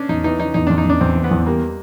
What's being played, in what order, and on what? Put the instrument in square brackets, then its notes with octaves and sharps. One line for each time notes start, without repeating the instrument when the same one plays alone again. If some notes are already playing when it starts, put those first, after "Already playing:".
Already playing: [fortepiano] C#4 D4
[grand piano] E2 [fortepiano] D#4
[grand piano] E3 [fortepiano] D#4
[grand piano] E3 [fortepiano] D#4
[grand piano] E2 [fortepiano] D#4
[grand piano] E2 [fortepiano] D4
[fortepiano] D#4
[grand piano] E2 [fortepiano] D4
[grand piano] E2 [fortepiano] C4
[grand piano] E3
[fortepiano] B3
[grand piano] E2
[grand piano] G3 [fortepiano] A#3